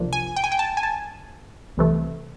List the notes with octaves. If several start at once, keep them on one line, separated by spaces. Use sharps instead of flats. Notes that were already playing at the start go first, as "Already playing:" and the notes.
Already playing: C2 C3 F3 A#3 D4
G#5
G5
G#5
G5
A5
G#5
A5
C2 C3 E3 A3